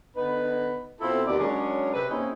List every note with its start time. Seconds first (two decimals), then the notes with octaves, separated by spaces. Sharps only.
0.16 D3 B3 D#4 B4
1.00 B2 C4 E4 F4 A4
1.26 D#2 B2 D5
1.39 F#3 G#3 C#4 D4 A#4 C#5
1.93 C3 B4
2.10 A#3 C4 C#4 D#4 E4 G#4